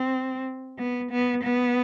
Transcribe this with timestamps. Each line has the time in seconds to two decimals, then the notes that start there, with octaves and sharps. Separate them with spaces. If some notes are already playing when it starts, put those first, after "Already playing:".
Already playing: C4
0.78 B3
1.11 B3
1.44 B3